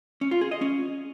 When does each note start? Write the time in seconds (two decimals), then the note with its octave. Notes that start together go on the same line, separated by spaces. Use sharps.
0.21 C#4
0.31 F4
0.41 G#4
0.51 D#5
0.61 C#4